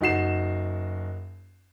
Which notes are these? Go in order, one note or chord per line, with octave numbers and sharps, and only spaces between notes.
F#1 D#4 F#4 C7 E7